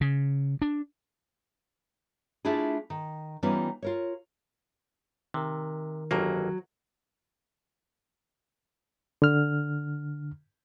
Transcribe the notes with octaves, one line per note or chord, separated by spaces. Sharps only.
C#3
D4
A3 D4 E4 F4 G#4
D#3
E3 G3 B3 C#4 D#4 F4
F4 A#4 C#5
C3 D#3 A#4
G1 F2 F#3 A#3
D3 F6